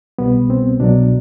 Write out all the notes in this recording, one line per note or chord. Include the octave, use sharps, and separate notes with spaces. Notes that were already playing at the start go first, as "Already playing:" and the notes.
C2 B2 G3 B3
C4
C2 B2 F#3 D4